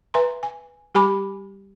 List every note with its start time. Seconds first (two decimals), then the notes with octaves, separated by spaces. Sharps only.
0.14 B4 E5 G#5 A#5 C6
0.43 G#5
0.95 G3 G4 G#5 B5 D6